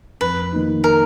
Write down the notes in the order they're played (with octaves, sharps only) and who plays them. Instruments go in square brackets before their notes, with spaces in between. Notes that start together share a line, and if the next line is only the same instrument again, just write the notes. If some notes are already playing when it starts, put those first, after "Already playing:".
[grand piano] F2 [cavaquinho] B4
[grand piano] D#3 A#3 D#4
[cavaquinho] A#4